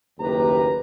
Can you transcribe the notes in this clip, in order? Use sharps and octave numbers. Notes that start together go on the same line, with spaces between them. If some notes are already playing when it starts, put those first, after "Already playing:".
F#1 D#2 A2 G4 B4 A#5